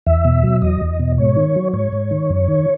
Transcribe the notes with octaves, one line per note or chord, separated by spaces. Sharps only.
E2 E5
B2
F#3
E2 D#5
E2
B2
G#2 C#5
D#3
F#3
G#2 C#5
G#2
D#3
F#2
D#3